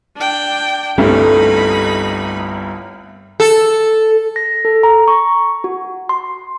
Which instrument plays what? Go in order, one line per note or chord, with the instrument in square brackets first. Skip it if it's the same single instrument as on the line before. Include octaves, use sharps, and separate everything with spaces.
[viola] D4 G5
[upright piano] G1 C2 G2 [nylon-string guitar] A3 [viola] D#4 B5
[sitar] A4
[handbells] A#6
A4
A#5
C#6
F#4
C6